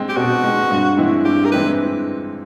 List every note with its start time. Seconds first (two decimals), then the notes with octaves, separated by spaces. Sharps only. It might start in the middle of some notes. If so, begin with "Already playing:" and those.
Already playing: G#3 C4
0.09 G4
0.17 B2 F#4
0.44 G#3 C4
0.71 G2
0.97 E3 G#3 C4 E4
1.25 G2 G4
1.45 A#4
1.52 E3 G#3 C4 E4 B4